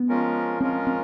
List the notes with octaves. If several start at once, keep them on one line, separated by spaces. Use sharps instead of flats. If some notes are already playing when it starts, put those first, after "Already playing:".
Already playing: B3
F3 G#3 C#4 F4 A#4
F3 G#3 C4 C#4 F4 A#4
C4